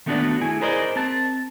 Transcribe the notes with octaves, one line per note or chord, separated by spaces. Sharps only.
D#3 A3 B3 D4 F#4 D5
A3 E4 G#4 G#5
G#4 A#4 C5 D5 D#5
C4 A5